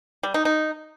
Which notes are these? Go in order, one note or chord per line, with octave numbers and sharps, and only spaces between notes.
G3
D#4
D#4